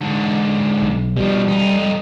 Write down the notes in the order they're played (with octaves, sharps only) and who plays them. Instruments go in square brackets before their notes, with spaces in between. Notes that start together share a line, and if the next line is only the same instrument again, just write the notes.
[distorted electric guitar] G#2 D3
[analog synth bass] B1
[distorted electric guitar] B2 F3 [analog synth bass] G3
[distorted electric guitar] F2 D#4